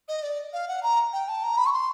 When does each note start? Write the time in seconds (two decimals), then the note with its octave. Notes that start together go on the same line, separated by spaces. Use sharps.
0.08 D#5
0.23 D5
0.53 F5
0.68 F#5
0.83 A#5
1.13 G5
1.28 A5
1.44 A#5
1.58 B5
1.66 C#6
1.73 C6